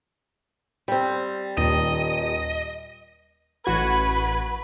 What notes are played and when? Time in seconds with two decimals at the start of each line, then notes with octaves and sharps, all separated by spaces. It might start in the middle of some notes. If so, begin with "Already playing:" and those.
0.88 G3 C4
1.57 D#1 D#2 D#5
3.66 A1 F#4 B4 G#6